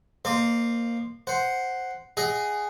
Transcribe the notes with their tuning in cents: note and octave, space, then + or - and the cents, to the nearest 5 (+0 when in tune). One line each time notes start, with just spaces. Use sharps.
A#3 +0 C5 +0 D#5 -40
C5 +0 F#5 +0
G#4 +0 D#5 +0 F#5 +25